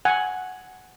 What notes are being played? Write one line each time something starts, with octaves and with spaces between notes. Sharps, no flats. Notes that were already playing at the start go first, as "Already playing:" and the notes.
F#5 G#5